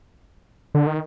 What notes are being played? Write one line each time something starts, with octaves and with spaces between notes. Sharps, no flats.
D3
D#3